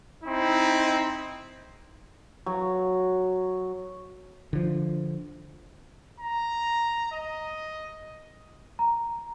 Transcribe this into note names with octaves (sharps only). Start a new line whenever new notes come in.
C4 D#4 E4
F#3
D3 F3
A#5
D#5
A#5